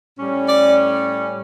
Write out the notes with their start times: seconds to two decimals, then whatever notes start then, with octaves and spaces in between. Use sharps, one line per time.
0.18 A2 G3 C#4
0.46 D5